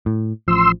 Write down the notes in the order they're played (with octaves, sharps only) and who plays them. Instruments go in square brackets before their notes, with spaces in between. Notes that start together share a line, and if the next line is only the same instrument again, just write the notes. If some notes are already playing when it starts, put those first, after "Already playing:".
[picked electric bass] A2
[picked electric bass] A1 F3 [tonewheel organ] C6 E6